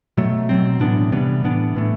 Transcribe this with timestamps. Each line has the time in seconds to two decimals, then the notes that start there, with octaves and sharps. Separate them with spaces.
0.17 B2 F#3 A3
0.49 B2 F#3 C4
0.80 A2 E3 B3 D4
1.12 C3 E3 G3 B3
1.43 A2 E3 B3 D4
1.75 A2 E3 A3